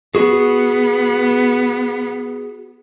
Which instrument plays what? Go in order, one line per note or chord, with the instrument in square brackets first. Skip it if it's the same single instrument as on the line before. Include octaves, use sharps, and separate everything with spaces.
[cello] B3 [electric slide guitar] F#4 G#4